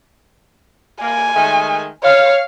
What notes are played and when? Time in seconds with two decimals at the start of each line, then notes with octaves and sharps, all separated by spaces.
1.02 A#3 G#5
1.35 D#3 G#3 A3
2.04 C#5 F5